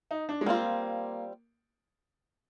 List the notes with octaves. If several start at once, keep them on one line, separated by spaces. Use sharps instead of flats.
D#4
D4
G#3
G3 A#3 C4 F4